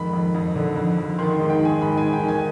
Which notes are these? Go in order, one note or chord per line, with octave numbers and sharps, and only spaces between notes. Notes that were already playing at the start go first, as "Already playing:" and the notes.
Already playing: F2 G#2 D#3 B5
F2
F2
D3
F2
F2
D#3 C6
C6
G#2
G5
D#3
G#5
G#2 B5
G#5
G#2
G5
D#3
G#5